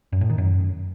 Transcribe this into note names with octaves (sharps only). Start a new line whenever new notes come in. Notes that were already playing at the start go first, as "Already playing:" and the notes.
F#2
A2
D#3
F#2